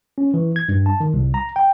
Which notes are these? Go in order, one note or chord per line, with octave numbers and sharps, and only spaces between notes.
C#4
E3
G#6
G2
A5
D#3
C2
A#5
G5